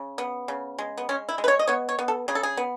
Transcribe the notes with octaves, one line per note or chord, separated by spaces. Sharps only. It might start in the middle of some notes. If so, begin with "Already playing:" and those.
Already playing: C#3
B3
C#3
G#3
B3
G#3 C#4
E4
G#3
B4
C#5
D#5
B3 C#5
C#5
B3
A4
C#3 G#4
A4
G#4
B3